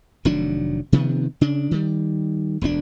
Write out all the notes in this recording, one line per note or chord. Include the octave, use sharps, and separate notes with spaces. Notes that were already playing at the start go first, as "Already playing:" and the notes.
F1 D#3 F#3 D4
C3 D#3 F3 B3
C#3 D4
D#3 G3
E1 D2 A#3 D4